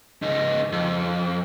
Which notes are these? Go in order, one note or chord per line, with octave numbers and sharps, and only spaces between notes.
C#2 D#4
F2